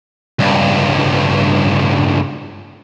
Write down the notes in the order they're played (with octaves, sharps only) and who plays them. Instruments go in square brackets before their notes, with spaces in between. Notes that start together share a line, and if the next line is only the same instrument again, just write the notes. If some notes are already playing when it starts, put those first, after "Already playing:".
[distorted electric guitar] C#2 G2